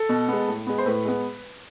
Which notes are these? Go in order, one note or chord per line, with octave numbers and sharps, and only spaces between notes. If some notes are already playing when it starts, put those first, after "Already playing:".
Already playing: A4
B2
G#3 B3
A2
G#3 B3
C5
A2 B4
G#3 B3